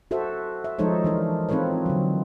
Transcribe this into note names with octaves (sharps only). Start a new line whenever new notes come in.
F#4 A4 C5 E5
E5
F3 G#3 D#4 A4 C5 C#5
E3 D4 A#4
C4 D#4 F4 A4 B4 C#5
D3 F#3